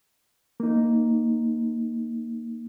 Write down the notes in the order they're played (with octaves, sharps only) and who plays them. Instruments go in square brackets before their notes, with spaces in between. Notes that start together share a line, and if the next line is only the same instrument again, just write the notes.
[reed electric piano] A#3 D#4